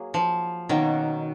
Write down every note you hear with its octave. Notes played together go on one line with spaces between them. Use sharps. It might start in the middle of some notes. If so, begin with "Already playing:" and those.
Already playing: F#3 A#3 G#4
F3
B2 D#3 F#3 A#3 C#4